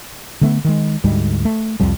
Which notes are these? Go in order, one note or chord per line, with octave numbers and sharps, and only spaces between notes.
D3 A3 B3
D#3 G#3
D2 G#2 G3 G#3
A3
C2 F2 F3 G3